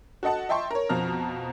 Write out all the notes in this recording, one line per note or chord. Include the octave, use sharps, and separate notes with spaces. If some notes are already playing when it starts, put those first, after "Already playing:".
F#4 A4 D#5 F#5 A5
D#5 E5 G5 A5 C6 C#6
A#4 C#5
F2 B2 F3 A#5 F6